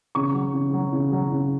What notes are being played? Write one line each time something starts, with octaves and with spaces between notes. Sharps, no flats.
C#3 C#6
F#3
C#3
F#3
C#3
F#3
C#3